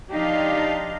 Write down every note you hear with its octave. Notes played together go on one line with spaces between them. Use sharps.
F3 D4 D#4 G4 F5